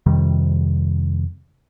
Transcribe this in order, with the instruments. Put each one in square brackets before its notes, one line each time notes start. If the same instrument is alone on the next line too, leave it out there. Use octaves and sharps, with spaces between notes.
[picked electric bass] F2 C3 D#3 G3